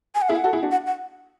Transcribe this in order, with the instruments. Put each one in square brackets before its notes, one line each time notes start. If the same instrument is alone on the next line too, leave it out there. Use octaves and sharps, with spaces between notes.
[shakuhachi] G#5
F#5
[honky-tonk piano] E4 G#4 [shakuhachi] E5
[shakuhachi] F#5
[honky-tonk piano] F#4 A4
E4 G#4
D4 F#4
[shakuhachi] F#5
F#5